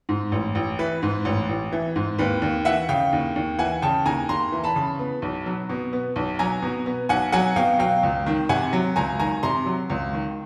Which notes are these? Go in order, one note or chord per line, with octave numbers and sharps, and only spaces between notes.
G#2
A1
A1
E3 B4
G#2
A1
A1
E3
G#2
D#2 B4
D#2
E3 E5 F#5
C#3 F5 G5
D#2
D#2
E3 F#5 G#5
C#3 G5 A5
D#2 G#5 A#5
D#2 A#5 C6
E3
A5 B5
C#3
B3
B1
F#3
B2
B3
B1
F#3 G#5 A#5
B2
B3
B1 F#5 G#5
F#3 F#5 G#5
B2 F5 G5
F#3 F5 G5
C#2
D#3
C3 F#5 G#5
F#3
C#2 G#5 A#5
D#3 G#5 A#5
C3 A#5 C6
F#3
C#2
D#3